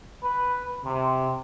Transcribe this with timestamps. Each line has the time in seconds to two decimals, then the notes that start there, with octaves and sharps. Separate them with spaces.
0.23 B4
0.84 C3